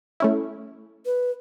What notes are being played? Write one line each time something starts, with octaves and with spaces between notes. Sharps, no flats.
A3 C#4 E4
B4